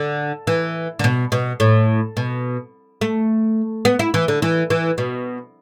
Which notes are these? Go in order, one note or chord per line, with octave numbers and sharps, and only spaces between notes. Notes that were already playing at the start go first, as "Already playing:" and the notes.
Already playing: D3
E3
D3
B2
B2
A2
B2
A3
B3
E4
E3
D3
E3
E3
B2